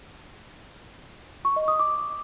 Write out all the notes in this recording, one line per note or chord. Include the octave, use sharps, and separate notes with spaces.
C#6
D#5
D#6
D6